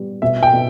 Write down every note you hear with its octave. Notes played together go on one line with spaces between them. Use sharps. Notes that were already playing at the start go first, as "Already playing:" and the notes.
Already playing: G3 B3
B2 E5
G5
B2